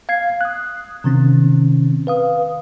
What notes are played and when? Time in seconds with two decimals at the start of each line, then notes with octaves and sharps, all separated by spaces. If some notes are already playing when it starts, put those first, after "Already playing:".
0.09 F5 G#6 C7
0.41 D#6 F#6
1.04 C3 D#3 C4 C#4
2.07 B4 F5 D#6